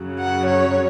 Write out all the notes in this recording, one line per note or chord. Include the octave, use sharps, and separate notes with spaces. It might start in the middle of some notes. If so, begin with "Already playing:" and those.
Already playing: F#2 C#3 F#3
F#5
C#5